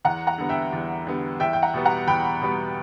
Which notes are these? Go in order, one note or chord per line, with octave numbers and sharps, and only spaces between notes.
E2 F#5 A#5
F#5 A#5
D3 G3 B3
E5 G5
E2
D3 G3 B3
E2 E5 G5
G5
F#5 A#5
B2 G3 B3
F#5 A#5
E2 G5 B5
B2 G3 B3